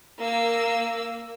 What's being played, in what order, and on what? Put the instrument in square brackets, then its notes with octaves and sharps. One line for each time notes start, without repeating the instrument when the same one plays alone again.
[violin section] A#3 E6